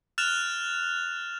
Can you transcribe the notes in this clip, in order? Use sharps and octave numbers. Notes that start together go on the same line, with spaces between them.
F6 F#6 A6 E7 F7